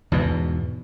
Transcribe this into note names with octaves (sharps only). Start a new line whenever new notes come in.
E2 G#2 B2